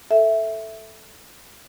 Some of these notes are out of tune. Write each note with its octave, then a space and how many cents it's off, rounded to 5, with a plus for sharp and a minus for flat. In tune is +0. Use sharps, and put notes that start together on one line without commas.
A4 +0 E5 +0